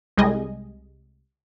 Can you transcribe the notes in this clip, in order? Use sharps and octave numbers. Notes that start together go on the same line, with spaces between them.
C2 G3 G#3 D#5 G#5